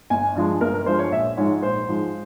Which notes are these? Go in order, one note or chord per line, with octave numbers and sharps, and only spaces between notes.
G1 G#5
G2 F3 G#3
G1 A#4
A#4
G2 F3 G#3 C5
C#5
A#1 E5
G#2 F3 G#3 C#5
A#1 C5
G#2 F3 G#3